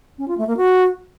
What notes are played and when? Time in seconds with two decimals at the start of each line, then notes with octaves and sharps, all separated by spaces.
0.18 C#4
0.28 F4
0.38 A3
0.47 A#3
0.57 F#4